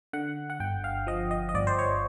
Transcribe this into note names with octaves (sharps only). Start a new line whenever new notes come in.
D3 F#5
F#5
G1 G5
F5
F3 D#5
D#5
D#5
G1 D5
C5
C#5